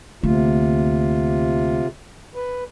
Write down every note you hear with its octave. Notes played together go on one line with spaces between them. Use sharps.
D2 C3 A#3 F4
B4